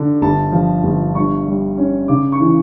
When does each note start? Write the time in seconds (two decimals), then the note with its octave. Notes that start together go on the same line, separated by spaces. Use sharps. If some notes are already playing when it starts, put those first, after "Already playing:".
Already playing: D3
0.22 G1 A5
0.52 F3
0.84 G1
1.15 G2 C#6
1.47 G3
1.78 C#4
2.08 C#3 D6
2.32 C#6
2.40 E3